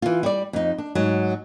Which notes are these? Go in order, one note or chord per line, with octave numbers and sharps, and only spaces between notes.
E3 F4
G3 D5
F2 D#4
D4
G#2 F#3